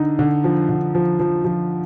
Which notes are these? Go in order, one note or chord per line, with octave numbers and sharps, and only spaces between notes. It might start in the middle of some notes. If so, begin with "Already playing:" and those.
Already playing: D3 D#4
D3
F3
D3
F3
F3
F3